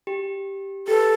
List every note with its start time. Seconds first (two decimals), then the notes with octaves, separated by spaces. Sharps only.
0.07 G4
0.88 G4 A4 B4